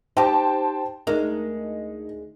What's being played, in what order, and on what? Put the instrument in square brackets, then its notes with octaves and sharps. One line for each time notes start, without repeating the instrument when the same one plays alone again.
[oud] D#4 G4 [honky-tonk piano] C5 G5 A5
[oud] D2 G#3 A#4 [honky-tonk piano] D#4